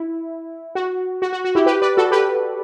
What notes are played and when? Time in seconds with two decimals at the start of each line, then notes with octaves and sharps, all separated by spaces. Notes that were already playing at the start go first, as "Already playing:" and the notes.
Already playing: E4
0.75 F#4
1.22 F#4
1.33 F#4
1.44 F#4
1.55 E4 G4
1.66 G4 B4
1.82 B4 D5
1.97 F#4 A4
2.11 G4 B4